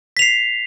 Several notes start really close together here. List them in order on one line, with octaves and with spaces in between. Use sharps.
B6 F7 C7